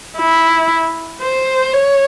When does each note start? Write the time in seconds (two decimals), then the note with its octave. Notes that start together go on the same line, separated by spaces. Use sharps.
0.18 E4
1.21 C5
1.73 C#5